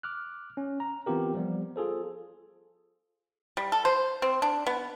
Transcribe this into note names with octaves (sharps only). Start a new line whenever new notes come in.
D6 F6 F#6
C#4
A#5
E3 B3 C4 F4 G4 A#4
F3 G3 B3
F4 G#4 A4 C5
G3
A4
C5
C4
D4
B3